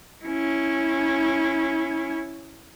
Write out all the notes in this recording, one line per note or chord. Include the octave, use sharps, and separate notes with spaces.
C#4 E4